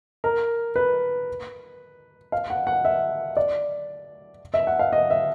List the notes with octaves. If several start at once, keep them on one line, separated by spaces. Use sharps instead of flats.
A#4
B4
F5
F#5
F#5
E5
D5
E5
F#5
F5
D#5
E5